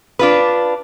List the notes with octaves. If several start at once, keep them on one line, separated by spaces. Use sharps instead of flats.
D4 F4 B4